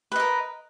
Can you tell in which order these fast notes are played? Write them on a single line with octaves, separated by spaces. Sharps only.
B4 D#5 A#4